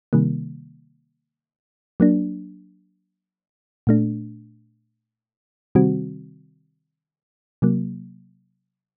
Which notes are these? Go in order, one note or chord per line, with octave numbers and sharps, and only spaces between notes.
C3 D#3 G3 A#3
F#3 A#3 D4
A#2 A3 D4
C3 D#3 G3 C4 F#4
C3 F#3 A#3